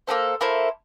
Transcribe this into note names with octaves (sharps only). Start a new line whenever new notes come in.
A#3 E4 A4 C5
A#3 E4 A4 C5